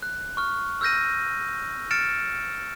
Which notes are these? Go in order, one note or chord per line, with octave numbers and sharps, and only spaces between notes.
F#6
C#6 F6
E6 F6 G6 A#6 D#7
F6 A6 C#7 D7 E7